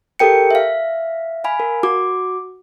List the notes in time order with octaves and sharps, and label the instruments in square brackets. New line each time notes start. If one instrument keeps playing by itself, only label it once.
[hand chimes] G4 A4 A#4 G5 C#7
E5 F5
F5 G#5 B5
A#4
F#4 D6